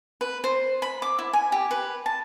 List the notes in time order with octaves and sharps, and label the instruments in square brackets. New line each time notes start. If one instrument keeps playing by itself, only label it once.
[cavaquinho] B4
C5
B5
D6
E4
G#5
G4
B4
A5